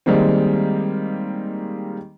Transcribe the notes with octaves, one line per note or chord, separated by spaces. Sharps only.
D#3 G3 G#3 A#3 C4